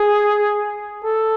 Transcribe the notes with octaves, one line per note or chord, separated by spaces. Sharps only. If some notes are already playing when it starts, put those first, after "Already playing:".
Already playing: G#4
A4